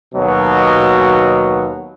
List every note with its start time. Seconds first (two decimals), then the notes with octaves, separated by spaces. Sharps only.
0.14 D#2 B2 F#3